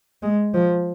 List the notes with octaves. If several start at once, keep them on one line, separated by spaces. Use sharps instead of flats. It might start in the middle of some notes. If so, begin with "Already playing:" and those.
G#3
F3